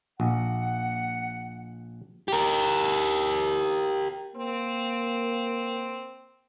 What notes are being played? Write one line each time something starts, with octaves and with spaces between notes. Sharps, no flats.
A#1 F#5
G4 A#4
A#3 C4